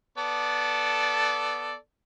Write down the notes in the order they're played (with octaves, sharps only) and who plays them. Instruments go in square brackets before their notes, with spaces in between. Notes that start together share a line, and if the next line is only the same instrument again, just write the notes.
[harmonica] B3 A4 D5